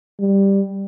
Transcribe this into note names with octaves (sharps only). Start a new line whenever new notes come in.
G3